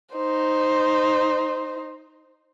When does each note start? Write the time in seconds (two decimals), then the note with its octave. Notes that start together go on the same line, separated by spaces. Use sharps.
0.14 D#4 C5